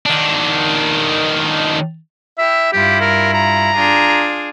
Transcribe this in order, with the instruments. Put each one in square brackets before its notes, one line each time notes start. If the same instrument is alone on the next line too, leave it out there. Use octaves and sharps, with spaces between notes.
[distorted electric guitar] D#3 D4
[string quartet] E4 G4 [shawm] E5
[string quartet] G2 E4 F4 [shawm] G4
[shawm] A#4
A#5
[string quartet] D4 F4 G#4